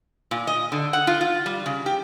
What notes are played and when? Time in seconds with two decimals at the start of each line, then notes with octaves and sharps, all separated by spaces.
0.31 A#2
0.47 D#5
0.72 D3
0.93 F#5
1.07 F4
1.21 F4
1.46 G3
1.66 C#3
1.86 G4